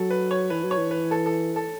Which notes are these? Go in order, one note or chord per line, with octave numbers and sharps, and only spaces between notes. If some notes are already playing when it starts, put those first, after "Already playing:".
Already playing: F#3 A4
B4
C#5
E3 B4
F#3
C#5
E3
B4
A4
A4
A4